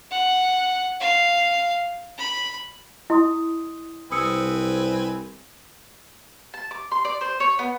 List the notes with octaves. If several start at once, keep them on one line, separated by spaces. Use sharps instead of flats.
F#5
F5
B5
E4 D#5 C6 D#6
C2 C4 B4 G#5 D#6 E6 C#7
A5
D6
C6
D5
C5
C#5
B3